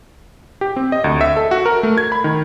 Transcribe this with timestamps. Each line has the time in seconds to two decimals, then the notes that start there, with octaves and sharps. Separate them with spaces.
0.61 G4
0.76 C4
0.92 D#5
1.04 D2
1.21 E5
1.37 A4
1.51 F#4
1.65 A#4
1.83 A3
1.98 G#6
2.12 B5
2.24 D#3